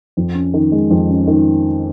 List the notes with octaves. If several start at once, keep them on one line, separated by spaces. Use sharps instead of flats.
F2
C#4
D#3
G#3
F2
C#4
D#3